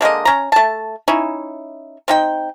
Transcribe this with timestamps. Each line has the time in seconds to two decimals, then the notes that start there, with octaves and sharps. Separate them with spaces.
0.01 D3 G#3 A#3 D#5
0.25 C#4 A#5
0.52 A3 A5
1.08 C#4 D#4 E4
2.08 C4 D#4 G5